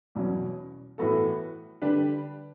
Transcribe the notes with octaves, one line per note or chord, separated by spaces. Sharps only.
E2 B2 F#3 C#4
A2 E3 B3 F#4 A4
D3 G3 D4 G4 B4